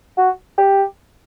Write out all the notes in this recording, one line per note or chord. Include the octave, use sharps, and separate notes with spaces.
F#4
G4